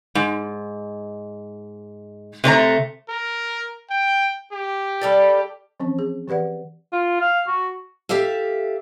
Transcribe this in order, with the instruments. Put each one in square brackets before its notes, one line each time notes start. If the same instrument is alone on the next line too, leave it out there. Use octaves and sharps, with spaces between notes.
[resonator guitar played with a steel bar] G#2
C3 A3 C#5 A#5
[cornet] A#4
G5
G4
[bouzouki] G3 A4 D5
[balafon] E3 F3 C4 C#4
G#4
E3 G4 B4 D5 F#5
[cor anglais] F4
F5
F#4
[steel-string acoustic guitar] G4 A4 E5 F5